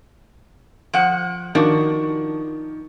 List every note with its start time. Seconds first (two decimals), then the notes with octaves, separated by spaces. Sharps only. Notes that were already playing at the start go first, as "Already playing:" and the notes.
0.94 F3 F#5
1.55 D#3 F3 D4 F#4